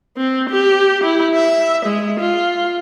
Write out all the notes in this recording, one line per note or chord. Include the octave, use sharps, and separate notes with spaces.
C4
G4
E4
E5
G#3
F4